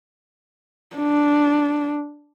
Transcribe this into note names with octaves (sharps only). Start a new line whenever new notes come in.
D4